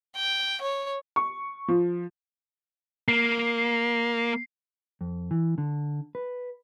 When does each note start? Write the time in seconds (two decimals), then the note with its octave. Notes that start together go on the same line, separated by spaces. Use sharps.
0.15 G5
0.61 C#5
1.16 C#6
1.68 F3
3.08 A#3 C7
5.01 F2
5.31 E3
5.58 D3
6.15 B4